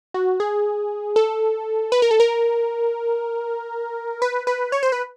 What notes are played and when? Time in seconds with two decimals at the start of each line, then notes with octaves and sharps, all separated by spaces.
0.14 F#4
0.40 G#4
1.16 A4
1.92 B4
2.02 A#4
2.11 A4
2.20 A#4
4.22 B4
4.47 B4
4.72 C#5
4.83 C5
4.92 B4